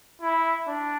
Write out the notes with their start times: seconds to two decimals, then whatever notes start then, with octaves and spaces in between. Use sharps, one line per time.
0.22 E4
0.68 D4